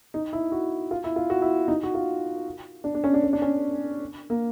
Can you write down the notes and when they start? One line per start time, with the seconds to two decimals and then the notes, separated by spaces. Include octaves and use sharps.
0.14 D#4
0.33 E4
0.52 F#4
0.91 F4
1.04 E4
1.16 F4
1.30 F#4
1.42 E4
1.68 D#4
1.83 F#4
1.94 F4
2.84 D4
2.94 D4
3.04 C#4
3.14 D4
3.23 C#4
3.33 D4
3.42 C#4
4.30 A#3